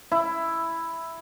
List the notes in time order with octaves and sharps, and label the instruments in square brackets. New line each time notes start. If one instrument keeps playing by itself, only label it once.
[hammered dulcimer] E4